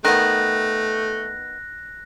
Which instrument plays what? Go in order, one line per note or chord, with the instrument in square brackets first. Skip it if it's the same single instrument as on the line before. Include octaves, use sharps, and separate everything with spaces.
[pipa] D#3 B3 [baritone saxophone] A3 [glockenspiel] F#6 A#6